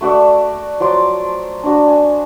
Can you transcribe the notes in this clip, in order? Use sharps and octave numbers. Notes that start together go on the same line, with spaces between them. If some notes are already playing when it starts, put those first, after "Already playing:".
A3 F#4 D5 E5
F3 F#3 C6 D6
D4 F#4
G#5